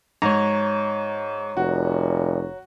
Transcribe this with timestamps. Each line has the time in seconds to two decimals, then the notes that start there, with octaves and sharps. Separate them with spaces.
0.22 G#2 C#5 A#5
1.57 F1 F#4